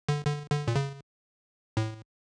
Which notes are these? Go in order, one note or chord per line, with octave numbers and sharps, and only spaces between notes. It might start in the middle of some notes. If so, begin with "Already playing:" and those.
D3
D3
D3
A#2
C#3
A2